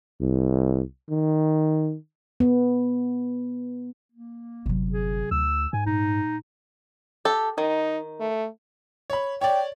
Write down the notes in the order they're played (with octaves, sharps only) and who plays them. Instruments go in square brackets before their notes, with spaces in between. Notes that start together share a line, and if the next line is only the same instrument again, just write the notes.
[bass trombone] C2
D#3
[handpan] B3
[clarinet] A#3
[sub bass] G1 [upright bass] C3 F#3
[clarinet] G#4
[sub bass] D2 [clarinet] E6
[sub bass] G#2 [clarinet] G#5
[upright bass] A#2 [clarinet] D#4
[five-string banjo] G4 A4
[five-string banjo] D#3 [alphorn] D#4
[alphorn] A3
[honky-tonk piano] C#5 B5
[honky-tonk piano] C#5 D5 [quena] G5